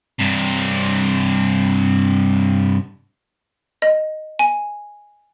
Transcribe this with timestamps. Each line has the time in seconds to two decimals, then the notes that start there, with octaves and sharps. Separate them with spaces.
0.19 G2 C3
3.82 D#5
4.39 G#5